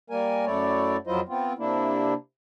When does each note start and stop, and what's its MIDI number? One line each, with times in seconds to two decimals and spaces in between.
0.10 0.45 55
0.10 0.45 58
0.10 0.45 70
0.10 0.45 80
0.46 0.97 42
0.46 0.97 57
0.46 0.97 64
0.46 0.97 73
0.46 0.97 74
1.07 1.20 41
1.07 1.20 54
1.07 1.20 64
1.07 1.20 65
1.07 1.20 72
1.07 1.20 75
1.29 1.53 59
1.29 1.53 60
1.29 1.53 65
1.59 2.14 48
1.59 2.14 58
1.59 2.14 62
1.59 2.14 64